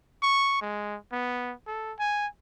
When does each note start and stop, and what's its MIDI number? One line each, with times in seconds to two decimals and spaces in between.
0.22 0.57 85
0.62 0.97 56
1.12 1.54 59
1.67 1.93 69
1.99 2.27 80